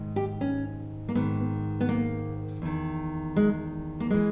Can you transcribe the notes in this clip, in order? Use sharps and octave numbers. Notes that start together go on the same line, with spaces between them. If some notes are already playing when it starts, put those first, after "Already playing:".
Already playing: G#2 D#3
G4
C#4
A#3
G#2 D#3 B3
B3
A#3
E2 D#3
G#3
A#3
E3 G#3